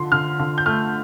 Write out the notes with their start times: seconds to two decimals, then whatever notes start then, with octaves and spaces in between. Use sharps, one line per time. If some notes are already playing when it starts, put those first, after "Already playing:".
Already playing: D3 F3 C6
0.12 D3 F6
0.39 D3
0.58 G6
0.66 A3 F6